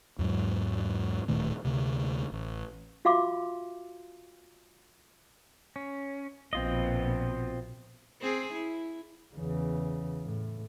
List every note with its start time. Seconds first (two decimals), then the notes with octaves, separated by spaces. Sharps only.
0.19 E2 G#2 F#3
1.28 D1 A#2 D#3 A3
1.65 D2 C3
2.32 A1
3.05 F4 F#4 E5 F5 C6 D6
5.76 C#4
6.53 A#1 B2 C4 F4 D#5
8.21 C4 G#4
8.54 E4
9.35 E2 C#3
10.24 A2